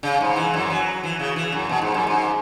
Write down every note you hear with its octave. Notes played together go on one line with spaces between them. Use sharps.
C#3
G#2
E3
F#2
F#3
E3
C#3
E3
F#2
B2
G#2
F#2
G#2